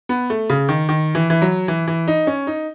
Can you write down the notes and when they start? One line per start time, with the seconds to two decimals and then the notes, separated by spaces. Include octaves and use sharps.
0.09 B3
0.30 A3
0.50 C#3
0.69 D#3
0.89 D#3
1.15 E3
1.30 E3
1.42 F#3
1.68 E3
1.88 E3
2.08 D#4
2.27 C#4
2.47 D#4